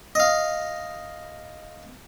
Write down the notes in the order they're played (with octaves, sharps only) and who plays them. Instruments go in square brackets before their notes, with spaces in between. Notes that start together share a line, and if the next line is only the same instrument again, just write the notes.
[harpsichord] D#5 F5